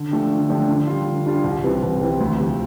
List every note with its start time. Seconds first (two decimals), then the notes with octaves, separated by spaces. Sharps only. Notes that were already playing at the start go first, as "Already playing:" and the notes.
Already playing: D3
0.11 F3 A3 D4 G4
0.30 D3
0.49 F3 A3 D4 G4
0.68 D3
0.87 G3 D4 F4
1.07 D3
1.26 G3 D4 F4
1.44 C2
1.63 C3 E3 G3 C4
1.83 C2
2.01 C3 E3 G3 C4
2.20 D2
2.39 C3 F3